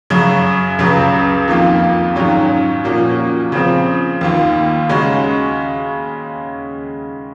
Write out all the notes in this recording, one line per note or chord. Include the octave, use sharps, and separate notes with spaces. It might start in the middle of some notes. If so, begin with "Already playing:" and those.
F#2 C#3 F#3
C#2 C#3 F#3
F2 D#3 A#3 F4
G#2 D#3 F#3 C#4 F4
A#2 F3 A#3 C#4 F#4
C#3 F3 C4
D#2 D#3 A#3 F4
C#3 G#3 C#4 F#4